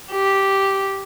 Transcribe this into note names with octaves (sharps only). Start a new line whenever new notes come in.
G4